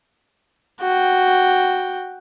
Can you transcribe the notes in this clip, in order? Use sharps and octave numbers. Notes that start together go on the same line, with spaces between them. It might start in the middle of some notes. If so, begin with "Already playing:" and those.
F#4 G5